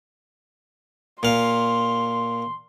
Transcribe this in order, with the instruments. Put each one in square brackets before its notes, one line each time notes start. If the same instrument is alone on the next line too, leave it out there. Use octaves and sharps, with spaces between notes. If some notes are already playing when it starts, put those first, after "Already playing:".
[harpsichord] A#2 F5 [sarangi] C6